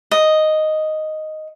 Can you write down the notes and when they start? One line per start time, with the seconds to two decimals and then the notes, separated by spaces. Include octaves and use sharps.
0.11 D#5